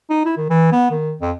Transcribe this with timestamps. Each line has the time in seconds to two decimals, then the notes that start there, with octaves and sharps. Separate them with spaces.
0.10 D#4
0.25 E4
0.37 D#3
0.50 E3
0.72 B3
0.91 D#3
1.21 F2